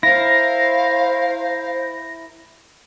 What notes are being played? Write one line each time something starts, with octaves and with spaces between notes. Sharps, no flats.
E4 A#4 C5 F5 A#6